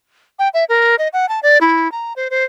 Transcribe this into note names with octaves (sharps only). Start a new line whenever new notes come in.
G5
E5
A#4
D#5
F#5
A5
D5
E4
A#5
C5
C5